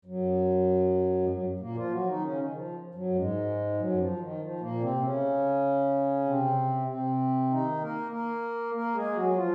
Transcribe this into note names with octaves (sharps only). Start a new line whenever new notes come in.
F#2 F#3
G#3
F#2 F#3
A#2 A#3
F3 F4
F#3 F#4
D#3 D#4
C#3 C#4
D#3
F3
F#2 F#3
G#2 G#3
F3
F#2 F#3
F3
D#3
F3
A#2 A#3
C3 C4
C#3 C#4
C3 C4
C3 C4
D#3 D#4
A#3 A#4
A#3 A#4
A#3 A#4
G#3 G#4
F#3 F#4
F#4
F3 F4